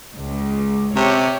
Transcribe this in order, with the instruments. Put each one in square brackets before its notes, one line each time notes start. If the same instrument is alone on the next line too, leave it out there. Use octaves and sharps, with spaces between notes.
[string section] C#2
[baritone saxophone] C3 [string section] G4 C#5